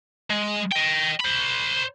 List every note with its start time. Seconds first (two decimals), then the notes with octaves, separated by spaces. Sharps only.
0.30 G#3
0.72 D#5 G5
1.20 C5 B5